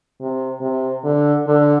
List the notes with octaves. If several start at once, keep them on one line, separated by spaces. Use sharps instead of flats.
C3
C3
D3
D3